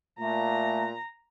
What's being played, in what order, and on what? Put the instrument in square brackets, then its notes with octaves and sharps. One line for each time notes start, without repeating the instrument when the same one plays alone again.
[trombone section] A#2 [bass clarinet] A3 [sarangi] A#5